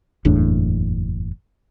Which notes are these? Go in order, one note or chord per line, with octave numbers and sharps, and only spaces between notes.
F#1 E2 A2 D4